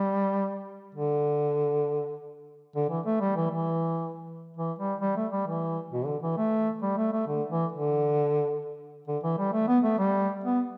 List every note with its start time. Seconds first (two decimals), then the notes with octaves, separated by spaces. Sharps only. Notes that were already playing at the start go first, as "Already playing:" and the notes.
Already playing: G3
0.95 D3
2.76 D3
2.90 E3
3.06 A3
3.20 G3
3.36 E3
3.50 E3
4.57 E3
4.78 G3
5.01 G3
5.16 A3
5.32 G3
5.47 E3
5.92 B2
6.06 D3
6.22 E3
6.37 A3
6.82 G3
6.97 A3
7.12 A3
7.27 D3
7.50 E3
7.72 D3
9.08 D3
9.23 E3
9.38 G3
9.53 A3
9.68 B3
9.83 A3
9.98 G3
10.44 B3